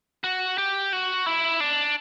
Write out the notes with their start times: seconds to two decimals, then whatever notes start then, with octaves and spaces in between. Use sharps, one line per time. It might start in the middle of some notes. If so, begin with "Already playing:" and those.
0.24 F#4
0.58 G4
0.93 F#4
1.26 E4
1.60 D4